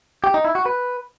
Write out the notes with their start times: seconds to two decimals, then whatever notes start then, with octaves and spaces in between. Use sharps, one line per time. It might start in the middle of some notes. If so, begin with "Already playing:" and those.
0.24 G4
0.34 D#4
0.45 E4
0.55 F#4
0.66 B4